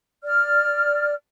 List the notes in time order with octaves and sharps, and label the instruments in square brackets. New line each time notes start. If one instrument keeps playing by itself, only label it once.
[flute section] D5 F6